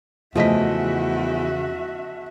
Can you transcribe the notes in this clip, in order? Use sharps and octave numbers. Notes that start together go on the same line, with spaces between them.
E2 C#3 F3 A3 F#4 D#5 E5 B6